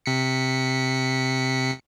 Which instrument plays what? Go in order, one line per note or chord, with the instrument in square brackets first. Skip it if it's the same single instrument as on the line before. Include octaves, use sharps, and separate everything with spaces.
[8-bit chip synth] C3 B6 C#7